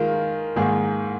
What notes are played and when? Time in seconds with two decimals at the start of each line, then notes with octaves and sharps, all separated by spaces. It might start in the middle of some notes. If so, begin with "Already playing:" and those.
Already playing: D#3 G#3 F4 A#4
0.56 G#2 D#3 A#3 G#4